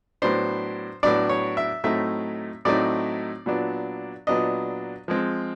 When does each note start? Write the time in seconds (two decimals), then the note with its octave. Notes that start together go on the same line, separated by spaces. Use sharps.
0.22 A2 F#3 B3 D4 C5
1.03 A2 F#3 B3 D4 D5
1.29 C#5
1.57 E5
1.84 A2 F#3 A3 C4 D#4 E5
2.65 A2 F#3 A3 C4 D#4 D5
3.46 A#2 F#3 B3 D4
4.27 A#2 F#3 B3 D4 D#5
5.08 F3 G#3 C4